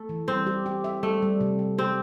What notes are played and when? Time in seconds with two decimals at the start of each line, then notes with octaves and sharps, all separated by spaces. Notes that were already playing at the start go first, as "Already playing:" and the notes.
Already playing: A3
0.09 E3
0.28 G3 C4
0.47 G4
0.66 G4
0.84 E5
1.03 G3 A3
1.22 G3
1.41 C3
1.59 G3
1.78 C4 G4